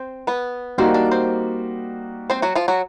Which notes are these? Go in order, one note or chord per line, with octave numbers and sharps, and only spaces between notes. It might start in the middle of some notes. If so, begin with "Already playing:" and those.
Already playing: C4 C5
B3 B4
G3 A#3 C4 D#4 F#4 C5
D4 D5
C4 C5
C4 C5
F#3 F#4
F3 F4
F#3 F#4